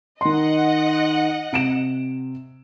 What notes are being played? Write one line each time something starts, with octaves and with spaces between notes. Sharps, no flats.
D#3 D#5 F#5 C6
C3 D7 E7